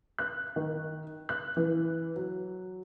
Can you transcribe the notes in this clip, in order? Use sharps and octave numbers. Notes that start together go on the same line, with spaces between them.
F#6
D#3
F#6
E3
F#3